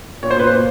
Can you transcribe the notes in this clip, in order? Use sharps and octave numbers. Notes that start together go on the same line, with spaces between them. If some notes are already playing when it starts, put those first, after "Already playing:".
A#2 C#5
C5
A#2 B4
A#2 C5